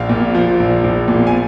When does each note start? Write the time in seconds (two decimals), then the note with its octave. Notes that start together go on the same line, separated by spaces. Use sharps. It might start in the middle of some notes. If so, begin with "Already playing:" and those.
Already playing: A#1 F5
0.09 A#2
0.35 F3
0.59 A#1
0.84 A#1
1.08 A#2
1.27 G#5